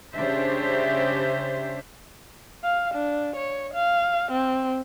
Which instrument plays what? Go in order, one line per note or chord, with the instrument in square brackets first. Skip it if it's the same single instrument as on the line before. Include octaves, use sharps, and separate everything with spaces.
[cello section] C#3 D4 G4 C5 E5
[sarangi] F5
D4
C#5
F5
C4